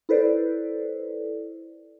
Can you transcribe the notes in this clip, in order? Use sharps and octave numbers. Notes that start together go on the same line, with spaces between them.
E4 A4 B4 C5 D5